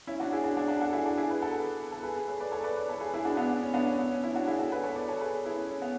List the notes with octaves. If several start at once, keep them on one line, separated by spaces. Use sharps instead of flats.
C#4 E4
D4 F#4
E4 G#4
D4 F#4
D4 F#4
D4 F#4
F#4 A4
E4 G#4
D4 F#4
E4 G#4
G#4 B4
F#4 A4
A4
G#4 B4
G#4 B4
A4 C#5
B4 D5
A4 C#5
B4 D5
B4 D5
A4 C#5
G#4 B4
E4 G#4
D4 F#4
B3 D4
C#4
C#4
B3 D4
C#4
B3
C#4
C#4 E4
D4 F#4
E4 G#4
F#4 A4
G#4 B4
A4 C#5
B4 D5
A4 C#5
G#4 B4
E4 G#4
C#4
C#4
B3